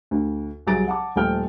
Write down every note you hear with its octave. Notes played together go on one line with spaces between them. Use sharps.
D2
C2 F#3 G#4 A#5 A6 D7
F#5 A5 D6
D#1 F3 A3 G5 F6